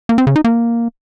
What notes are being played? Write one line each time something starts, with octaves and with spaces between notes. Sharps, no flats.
A#3
C4
C#3
D#4
A#3